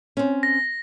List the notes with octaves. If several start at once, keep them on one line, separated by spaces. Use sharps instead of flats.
C4 C#4
A#6